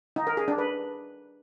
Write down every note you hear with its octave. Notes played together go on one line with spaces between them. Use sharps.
D#4
A#4
G#4
D4
B4